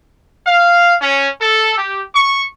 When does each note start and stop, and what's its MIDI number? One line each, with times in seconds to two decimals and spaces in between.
0.47 0.95 77
1.02 1.27 61
1.41 1.74 69
1.78 2.02 67
2.15 2.44 85